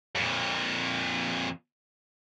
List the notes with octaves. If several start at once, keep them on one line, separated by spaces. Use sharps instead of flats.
F2 A#2